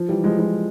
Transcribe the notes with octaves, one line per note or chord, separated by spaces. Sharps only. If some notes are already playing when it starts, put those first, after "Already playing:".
Already playing: F3
E3 G3
F3 G#3
F3 G#3